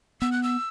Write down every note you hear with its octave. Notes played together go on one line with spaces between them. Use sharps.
B3 E6
F#6
E6